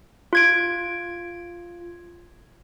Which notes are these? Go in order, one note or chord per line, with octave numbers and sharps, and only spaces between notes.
F4 G#6 D7